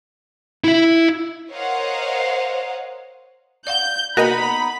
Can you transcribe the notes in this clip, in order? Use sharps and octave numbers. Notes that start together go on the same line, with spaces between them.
E4 E5
A#4 C5 C#5 D#5 F5 F#5
D5 F5 F#5 G6
A#3 B3 D#4 F#4 A#4 D#5 B5